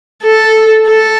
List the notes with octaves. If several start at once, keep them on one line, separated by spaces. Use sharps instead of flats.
A4
A4